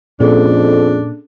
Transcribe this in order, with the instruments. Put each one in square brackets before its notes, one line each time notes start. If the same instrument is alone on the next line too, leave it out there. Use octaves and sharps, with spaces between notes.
[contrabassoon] F2 [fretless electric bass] A#2 [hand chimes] C#4 G#4 A4 [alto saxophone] D4